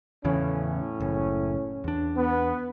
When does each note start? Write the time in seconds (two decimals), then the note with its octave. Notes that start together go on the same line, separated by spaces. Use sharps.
0.25 E2 A2 C#3 E3 C#4
1.00 F#1
1.84 E2 D4
2.16 B3